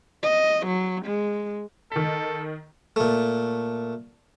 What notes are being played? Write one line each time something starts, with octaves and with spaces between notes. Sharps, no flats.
D#5
F#3
G#3
D#3 A4 B6
A#2 A3